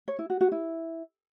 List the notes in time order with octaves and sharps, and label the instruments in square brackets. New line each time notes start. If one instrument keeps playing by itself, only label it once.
[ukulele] C#5
E4
F#4
F#4
E4